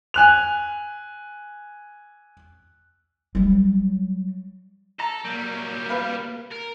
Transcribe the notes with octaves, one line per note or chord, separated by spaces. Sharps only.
G#5 F#6 F7
F#3 G3
A4 A#5
F#3 G3 A#3
B4 F5 B5
A#4